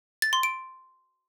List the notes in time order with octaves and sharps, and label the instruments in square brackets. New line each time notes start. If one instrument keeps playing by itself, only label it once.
[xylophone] A6
C6
D7